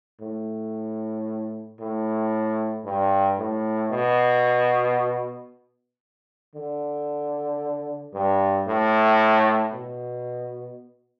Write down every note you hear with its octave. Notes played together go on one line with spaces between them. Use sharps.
A2
A2
G2
A2
B2
D3
G2
A2
B2